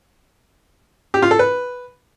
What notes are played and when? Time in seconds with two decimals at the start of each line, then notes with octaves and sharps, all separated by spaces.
1.14 G4
1.22 F4
1.31 A4
1.39 B4